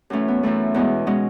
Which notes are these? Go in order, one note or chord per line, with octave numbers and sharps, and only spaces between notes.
F#2 E3 A3 C#4
B3
F#2 E3 A3
E2 B2 G#3
B2 G#3 C#4